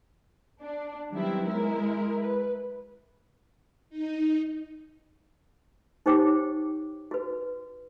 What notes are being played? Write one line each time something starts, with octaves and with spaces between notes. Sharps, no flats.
D4
D#3 F#3 G3 B3 C4 E4
G#3 E4 A#4
B4
D#4
D#4 G4 C5 C#5 G5 D6
F#4 B4